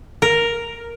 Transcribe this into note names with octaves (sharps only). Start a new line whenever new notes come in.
A#4